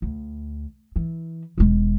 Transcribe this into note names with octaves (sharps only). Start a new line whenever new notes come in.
D2
E3
E1 G#3